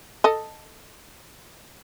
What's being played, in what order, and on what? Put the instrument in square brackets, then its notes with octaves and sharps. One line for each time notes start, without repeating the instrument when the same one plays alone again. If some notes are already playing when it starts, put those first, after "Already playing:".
[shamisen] A4 D#5